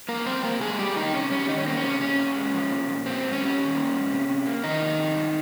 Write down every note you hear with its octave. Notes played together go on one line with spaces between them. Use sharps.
F2 A#3 A#4
G3 C4 C5
C3 A#3 A#4
G#3 A#3 G#4
F2 G3 G4
D#3 A#3 D#4
C3 C#4
G3 C#4
D#3 D#4
C#4
A#3 C4
C#4
C3
A#2 C#4
A#2
G#3
F3
A#2
A#2
A#3 C4
G#2
C#4
G3
D#3
A#3
G#2
C3
C3
A#3
D#3 F3 D#4
C3
C3
G2